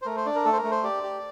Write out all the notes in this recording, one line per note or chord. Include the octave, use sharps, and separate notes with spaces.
C5
A3 A#4
C5
D4 D5
A#4
A3 A4
C5
A#4
A3
C5
G4 D5
G4